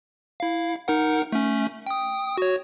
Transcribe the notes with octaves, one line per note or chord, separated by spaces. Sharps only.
E4 F5
D#4 A#4 F#5
A3 C#4
G5 D#6
F#4 C#5